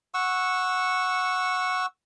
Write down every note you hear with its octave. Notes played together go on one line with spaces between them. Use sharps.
F#5 C#6 E6